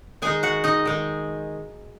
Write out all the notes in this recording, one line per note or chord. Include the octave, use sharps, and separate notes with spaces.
D#3 G#3 D#4 G#4 G#5
F#4 F#5
D#4 D#5
D#3 G#3 D#4